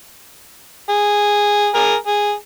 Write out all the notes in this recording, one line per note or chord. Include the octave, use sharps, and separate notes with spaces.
G#4
G#4 A#4
G#4